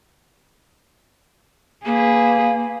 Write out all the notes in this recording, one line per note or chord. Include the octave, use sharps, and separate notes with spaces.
A#3 G#4 B4